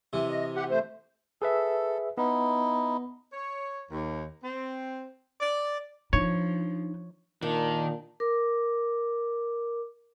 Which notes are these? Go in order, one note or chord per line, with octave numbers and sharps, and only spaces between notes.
C3 E3
D#5
G4 F#5
A3 C5
G#4 A4 B4 E5
B3 D#4 E4
C#5
D#2
C4
D5
F3 D4 D#4 C#5
A#2 D#3 D4
A#4 D6